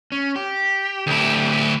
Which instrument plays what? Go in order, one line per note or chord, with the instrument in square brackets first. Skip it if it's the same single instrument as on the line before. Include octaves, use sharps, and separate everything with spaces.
[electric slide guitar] C#4
G4
[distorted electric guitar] D2 E4